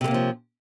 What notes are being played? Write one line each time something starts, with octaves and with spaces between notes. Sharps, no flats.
C3 F3 G#3 A#3 C#4